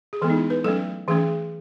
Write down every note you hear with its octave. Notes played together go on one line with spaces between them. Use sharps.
G#4
E3 G#3 B3 A4
D#4
E4
B4
F#3 A3 C#4 A4
E3 A3 C#4 G#4